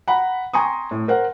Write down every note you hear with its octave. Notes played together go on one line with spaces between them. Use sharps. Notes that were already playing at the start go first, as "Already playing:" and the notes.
F#5 A#5 B5
G5 G#5 A#5 C6 C#6 D#6
A2
A#4 C5 F#5